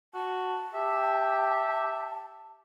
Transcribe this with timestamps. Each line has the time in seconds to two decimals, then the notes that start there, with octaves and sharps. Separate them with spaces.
0.14 F#4 A5
0.74 G4 E5